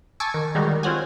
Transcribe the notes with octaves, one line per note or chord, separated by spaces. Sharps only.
G#5 A5 C#6 D6 E6
D#3
D#3 G3 G#3 D#4 F#4 G4
D#3
C4 F4 C#5 F#5 G#5